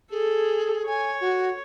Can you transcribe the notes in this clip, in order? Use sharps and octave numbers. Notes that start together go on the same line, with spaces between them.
G#4 A4
C#5 G#5
F#4